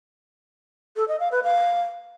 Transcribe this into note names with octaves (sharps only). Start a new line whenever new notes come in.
A4
D#5
F5
B4
F5